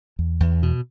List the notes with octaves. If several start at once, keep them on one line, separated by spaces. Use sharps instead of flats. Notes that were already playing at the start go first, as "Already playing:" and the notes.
E2
E2
B2